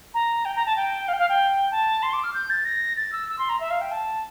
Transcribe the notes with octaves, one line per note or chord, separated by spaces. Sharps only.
A#5
G5
A#5
A5
G5
F5
G5
F5
G5
A5
C6
D6
F6
G6
A6
A#6
A6
E6
E6
C6
A#5
E5
F5
G5
A5